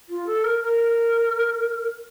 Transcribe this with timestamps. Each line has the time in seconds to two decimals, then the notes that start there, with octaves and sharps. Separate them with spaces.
0.09 F4
0.26 A4
0.44 A#4
0.60 A#4